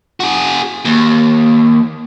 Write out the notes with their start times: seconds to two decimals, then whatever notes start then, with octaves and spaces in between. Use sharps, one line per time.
0.20 F#4 G#4
0.85 D#2